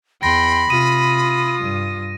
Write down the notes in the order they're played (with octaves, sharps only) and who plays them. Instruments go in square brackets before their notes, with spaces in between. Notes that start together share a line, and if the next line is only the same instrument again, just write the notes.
[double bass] E2 [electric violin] G5 C6 [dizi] B5 [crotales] A#6
[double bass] C3 [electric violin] F4 D#6 [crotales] D#7
[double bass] G2